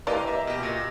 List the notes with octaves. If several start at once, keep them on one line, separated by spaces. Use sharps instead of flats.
E3 A#3 G4 B4 D5 D#5 F5
D#5 E5 A#5
B2 G4
A#2 A#6